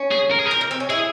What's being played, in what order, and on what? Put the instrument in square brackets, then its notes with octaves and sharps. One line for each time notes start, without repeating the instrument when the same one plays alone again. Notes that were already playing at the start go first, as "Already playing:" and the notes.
Already playing: [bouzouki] C#4
[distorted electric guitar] G#4
A#4
G#4
A#4
[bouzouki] C4
A#3
C4
C#4
[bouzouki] E4 [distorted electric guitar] G#4